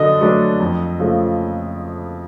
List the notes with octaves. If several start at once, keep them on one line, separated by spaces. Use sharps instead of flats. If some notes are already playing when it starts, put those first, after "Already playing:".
Already playing: D3 F#3 D4 D#5
F#3 A3 D4
F2
C#3 F3 A3